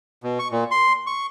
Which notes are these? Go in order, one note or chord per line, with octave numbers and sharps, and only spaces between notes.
B2
C#6
A#2
C6
C#6